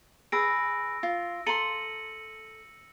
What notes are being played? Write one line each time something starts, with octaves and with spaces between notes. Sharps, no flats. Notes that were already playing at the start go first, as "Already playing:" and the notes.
G#4 B4 E6 A#6 D7
F4
A4 A#5 C6 C#7 D#7 F#7